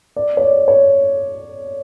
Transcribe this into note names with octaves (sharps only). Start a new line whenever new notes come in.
D5
C#5
D5
C#5